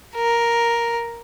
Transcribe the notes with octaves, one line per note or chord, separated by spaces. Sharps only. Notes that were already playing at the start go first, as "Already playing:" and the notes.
A#4